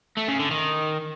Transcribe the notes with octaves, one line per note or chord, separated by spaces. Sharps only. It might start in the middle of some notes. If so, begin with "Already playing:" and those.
A3
C#3
D3
D#3